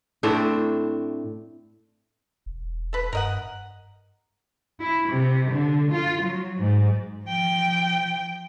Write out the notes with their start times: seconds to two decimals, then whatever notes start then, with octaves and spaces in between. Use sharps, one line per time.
0.23 A2 A3 C4 D4
2.46 E1
2.93 A4 B4
3.13 G2 A#4 D#5 F#5
4.80 E4
5.10 C3
5.50 D3
5.92 F4
6.23 F#3
6.58 G#2
7.25 F3 G5